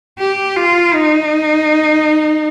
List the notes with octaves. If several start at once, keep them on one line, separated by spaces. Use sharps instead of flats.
G4
F4
D#4